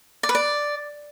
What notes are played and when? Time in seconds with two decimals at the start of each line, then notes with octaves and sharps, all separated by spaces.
0.23 D5
0.29 B4
0.35 D5